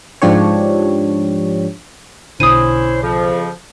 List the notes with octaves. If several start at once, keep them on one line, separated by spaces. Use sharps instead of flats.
G#2 F3 D4 G4 C#5
B1 B2 D3 C#4 E4 C5 D#6 D#7
F2 C#3 F3